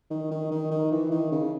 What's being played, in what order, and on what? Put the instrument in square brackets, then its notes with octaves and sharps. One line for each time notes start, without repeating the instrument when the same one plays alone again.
[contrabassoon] D#3
D#3
D#3
D#3
E3
D#3
C#3